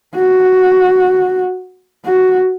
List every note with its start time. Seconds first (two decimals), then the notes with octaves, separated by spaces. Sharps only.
0.15 F#4
2.05 F#4